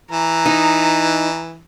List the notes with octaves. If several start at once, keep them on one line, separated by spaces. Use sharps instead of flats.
E3 A#5
D#4